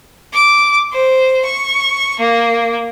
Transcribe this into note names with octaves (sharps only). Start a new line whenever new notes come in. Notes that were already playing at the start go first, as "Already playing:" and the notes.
D6
C5
C#6
A#3